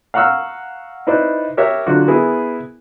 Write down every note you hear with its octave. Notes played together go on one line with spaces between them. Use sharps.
F5 F#5 A#5 C#6 E6 F6
D#4 E4 B4 C5 D5
G4 A#4 C#5 E5
D3 F#3 F4 F#4 D6
B3 E4 G#4 A#4